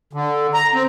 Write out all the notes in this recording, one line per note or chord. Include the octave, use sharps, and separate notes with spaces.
D3
A#5
C4